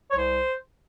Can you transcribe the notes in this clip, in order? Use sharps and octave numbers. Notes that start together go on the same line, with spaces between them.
C#5
C2 C5